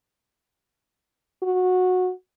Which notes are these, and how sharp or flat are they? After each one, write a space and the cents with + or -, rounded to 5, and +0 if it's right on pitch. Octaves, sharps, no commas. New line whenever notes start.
F#4 -15